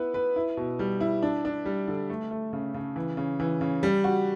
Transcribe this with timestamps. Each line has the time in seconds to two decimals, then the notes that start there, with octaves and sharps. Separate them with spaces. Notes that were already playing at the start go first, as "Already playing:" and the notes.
Already playing: B3 E4 B4
0.14 B4
0.36 E4
0.57 B2
0.79 G3
1.01 E4
1.23 D4
1.45 D4
1.66 G3
1.88 D3
2.10 A3
2.31 A3
2.53 C#3
2.74 C#3
2.96 E3
3.17 C#3
3.40 E3
3.61 C#3
3.83 G3
4.04 F#4